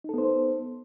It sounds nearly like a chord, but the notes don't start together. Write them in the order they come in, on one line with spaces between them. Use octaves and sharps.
D#4 A4 B3 C5